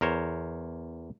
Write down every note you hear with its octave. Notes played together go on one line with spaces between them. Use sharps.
E2 A#4 C5 C#5